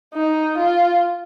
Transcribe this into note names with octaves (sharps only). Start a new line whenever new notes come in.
D#4
F4